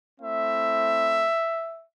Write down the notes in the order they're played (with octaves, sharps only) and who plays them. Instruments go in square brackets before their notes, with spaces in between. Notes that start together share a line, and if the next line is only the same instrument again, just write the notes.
[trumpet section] A3 C4 E4 E5